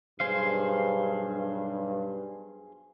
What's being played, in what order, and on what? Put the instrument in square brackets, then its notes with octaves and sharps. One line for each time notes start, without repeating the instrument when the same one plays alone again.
[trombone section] B1 G2 [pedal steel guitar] G#4 C5 F5